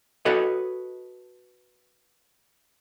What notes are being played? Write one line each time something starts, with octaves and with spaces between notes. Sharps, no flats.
F#4 A4 B4 C#5 D#5